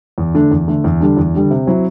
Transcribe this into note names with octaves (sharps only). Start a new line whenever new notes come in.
E2
D3 A3 D4
E2
D3 A3 D4
E2
D3 G3 D4
E2
D3 G3 D4
C3
F#3 C4 E4